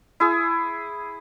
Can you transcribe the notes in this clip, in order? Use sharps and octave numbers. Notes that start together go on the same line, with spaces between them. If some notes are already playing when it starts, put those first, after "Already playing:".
E4 G#4